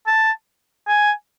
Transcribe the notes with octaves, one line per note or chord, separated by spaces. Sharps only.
A5
G#5